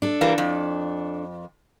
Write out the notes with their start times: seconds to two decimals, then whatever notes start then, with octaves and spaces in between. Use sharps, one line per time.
0.02 D4 A4
0.21 E3 G3 A#3
0.38 F2